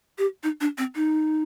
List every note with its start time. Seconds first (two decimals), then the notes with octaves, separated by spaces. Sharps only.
0.18 G4
0.43 D#4
0.61 D4
0.78 C4
0.95 D#4